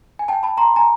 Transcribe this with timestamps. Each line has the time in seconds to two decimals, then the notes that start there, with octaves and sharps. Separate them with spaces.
0.19 G#5
0.28 G5 A5
0.43 A5 B5
0.58 A#5 C6
0.76 G#5 A#5